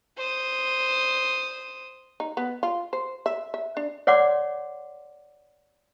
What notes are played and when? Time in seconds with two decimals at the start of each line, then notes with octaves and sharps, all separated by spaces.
0.18 C5 D#6
2.20 D#4
2.37 B3
2.63 F4
2.93 C5
3.26 E5
3.54 E5
3.77 D4
4.07 C#5 D5 F#5 C6 D6